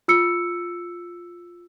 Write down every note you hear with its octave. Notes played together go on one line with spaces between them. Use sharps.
F4 E6 C#7